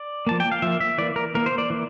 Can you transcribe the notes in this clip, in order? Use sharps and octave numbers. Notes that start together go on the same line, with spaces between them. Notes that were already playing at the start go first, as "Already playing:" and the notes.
Already playing: D5
F3 A#3 A5
G5
F5
F3 A#3 E5
E5
E3 A#3 D5
A#4
E3 A#3 A#4
C5
D5
E3 A#3